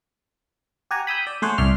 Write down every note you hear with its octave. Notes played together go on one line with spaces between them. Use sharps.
G4 F#5 G#5 A#5
B5 D#6 E6 G6
D5
A3 G#4 C5 C#5 F#5
C2 D5 E5 C6 F6